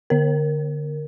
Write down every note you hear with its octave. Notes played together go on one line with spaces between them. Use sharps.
D3 A#4